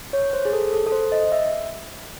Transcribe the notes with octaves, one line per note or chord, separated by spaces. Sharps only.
C#5
C5
G#4
A4
A4
A4
C5
D#5
E5